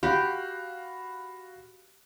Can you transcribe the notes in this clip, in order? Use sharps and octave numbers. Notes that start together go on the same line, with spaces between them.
F#4 G4 F5 B5